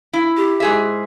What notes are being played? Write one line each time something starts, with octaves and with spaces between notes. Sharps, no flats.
E4
G4
G#2 G#4 E5